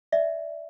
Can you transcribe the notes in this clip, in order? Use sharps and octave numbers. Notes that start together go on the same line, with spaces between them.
D5 E5